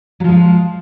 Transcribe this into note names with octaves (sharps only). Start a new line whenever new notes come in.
F3 F#3 G#3 F4